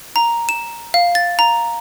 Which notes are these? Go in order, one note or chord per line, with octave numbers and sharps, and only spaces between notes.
A#5
E7
F5
A6
A#5